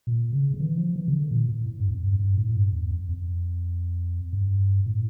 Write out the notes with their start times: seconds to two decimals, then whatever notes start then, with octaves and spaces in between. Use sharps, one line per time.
0.07 A#2
0.33 C#3
0.54 D3
0.60 E3
0.78 F3
0.96 E3
1.08 C#3
1.14 D3
1.31 A#2
1.49 A2
1.66 A2
1.80 G2
1.88 E2
1.93 F2
2.07 G2
2.20 G2
2.37 A2
2.49 A2
2.55 G2
2.73 E2
2.91 F2
3.09 F2
4.33 G2
4.86 A2